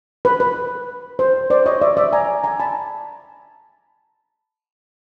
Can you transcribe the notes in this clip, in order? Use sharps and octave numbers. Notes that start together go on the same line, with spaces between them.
B4
B4
C5
C5 D5
C#5 D#5
D5 E5
D5 E5
G#5 A#5
G#5 A#5
A5 B5